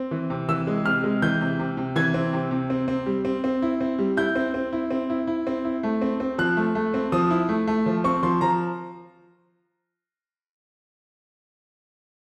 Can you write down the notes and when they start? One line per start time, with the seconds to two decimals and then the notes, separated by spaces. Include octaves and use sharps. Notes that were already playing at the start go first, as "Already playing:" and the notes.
Already playing: C4
0.11 E3
0.30 C3
0.49 E3 E6
0.67 G#3
0.85 C3 F6
1.04 G#3
1.22 E3 G6
1.41 C3
1.59 C3
1.77 C3
1.96 E3 G#6
2.14 C4
2.33 C3
2.51 C3
2.70 C4
2.88 C4
3.06 G3
3.25 C4
3.44 C4
3.62 E4
3.81 C4
3.99 G3
4.17 E4 G6
4.35 C4
4.54 C4
4.73 E4
4.90 C4
5.10 E4
5.27 E4
5.47 C4
5.65 E4
5.83 A3
6.02 C4
6.20 C4
6.38 F3 F#6
6.57 A3
6.75 A3
6.94 C4
7.12 F3 D#6
7.30 E4
7.49 A3
7.67 A3
7.86 F3
8.04 C4 C#6
8.23 F3 C6
8.41 F3 A#5